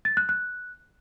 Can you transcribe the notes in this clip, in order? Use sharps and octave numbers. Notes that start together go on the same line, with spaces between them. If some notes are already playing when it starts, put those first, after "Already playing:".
A6
F#6
F#6